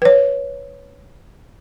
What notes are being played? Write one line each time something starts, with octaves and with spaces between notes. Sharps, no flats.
B4 C#5